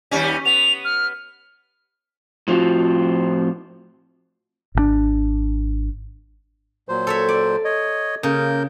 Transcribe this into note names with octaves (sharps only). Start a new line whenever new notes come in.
D#2 G3 C#4
B3 F7
F6
A2 F3 C4 F4 F#4
G#1 C3 D4
A#2 F#3 C5
A4 C#5 E5
D5
C#5 D#5
C#3 A#3 A#4 G6